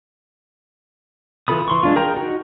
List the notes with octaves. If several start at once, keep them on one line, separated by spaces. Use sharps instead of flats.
E3 F4 A4 B5 D#6
E3 C6 C#6
G#3 D4 F4
G#4 A#4 G5 A#5
D#4 F#4